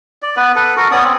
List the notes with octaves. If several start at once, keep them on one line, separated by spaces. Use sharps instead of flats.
D5
B3 B4
A4 B4
F#4 A4 A#4
B3 C#4 D5 D#6
C4